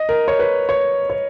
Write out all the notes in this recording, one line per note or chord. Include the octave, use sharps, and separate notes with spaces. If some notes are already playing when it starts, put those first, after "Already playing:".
Already playing: D#5
A#4
C#5
B4
C#5
C#5